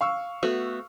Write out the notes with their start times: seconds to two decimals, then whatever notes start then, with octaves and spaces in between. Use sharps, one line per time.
0.01 F5 C#6 E6
0.43 A3 B3 F#4